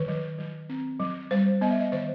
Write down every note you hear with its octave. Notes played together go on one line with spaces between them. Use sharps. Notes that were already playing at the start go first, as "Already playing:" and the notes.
Already playing: D#3 B4
F#3
F#3
C4
F#3
G3 C5
B3 D#5
E5
D#5
D#3 C5